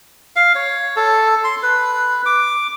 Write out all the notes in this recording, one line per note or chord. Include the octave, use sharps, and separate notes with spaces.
F5
C#5
A4
C6
B4
D6